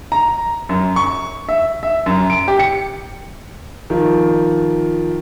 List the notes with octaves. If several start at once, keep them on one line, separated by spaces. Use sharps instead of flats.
A#5
F#2
C#6
E5
E5
F#2
D7
G4
C#7
D#3 F3